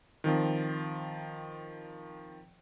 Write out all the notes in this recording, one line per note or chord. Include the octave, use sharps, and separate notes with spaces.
D#3 F3 C4